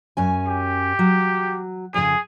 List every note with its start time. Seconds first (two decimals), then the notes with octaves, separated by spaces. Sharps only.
0.17 F#2 C#4 G#5
0.47 G4
0.99 F#3
1.94 F2 A#2 C#3 G#4